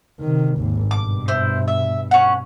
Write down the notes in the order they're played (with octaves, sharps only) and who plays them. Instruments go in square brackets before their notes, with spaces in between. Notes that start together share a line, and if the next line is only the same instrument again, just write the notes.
[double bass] C3 D#3
G#1 D#2
[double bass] G2 B2 [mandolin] D6
[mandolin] E4 C5
E5
C#4 F#5